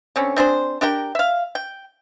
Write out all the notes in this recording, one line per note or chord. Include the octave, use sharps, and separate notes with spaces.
D3 C4 C#4
C4 D4 G#4 C5
D4 G4 A#4 G5
E5 F5
G5